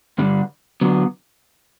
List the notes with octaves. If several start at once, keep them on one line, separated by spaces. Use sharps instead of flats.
G2 D3 G3 D4
D3 F#3 B3